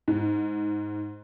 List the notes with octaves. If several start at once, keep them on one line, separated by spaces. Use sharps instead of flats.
G#2